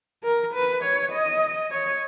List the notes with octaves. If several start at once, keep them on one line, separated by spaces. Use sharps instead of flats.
A#4
B4
C#5
D#5
C#5